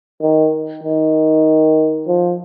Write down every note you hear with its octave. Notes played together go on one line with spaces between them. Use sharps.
D#3
D#3
F3